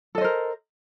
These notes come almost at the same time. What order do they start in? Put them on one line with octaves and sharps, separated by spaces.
A4 D#5 C5 A#4